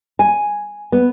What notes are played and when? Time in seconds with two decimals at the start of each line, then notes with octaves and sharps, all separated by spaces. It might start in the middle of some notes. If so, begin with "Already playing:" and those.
0.19 G#5
0.92 B3